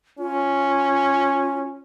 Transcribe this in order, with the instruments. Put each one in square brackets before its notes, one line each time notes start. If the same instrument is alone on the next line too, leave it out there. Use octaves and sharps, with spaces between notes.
[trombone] C#4 [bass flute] F4